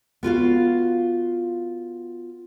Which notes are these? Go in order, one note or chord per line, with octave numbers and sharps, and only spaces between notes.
B3 F4 F#4 F5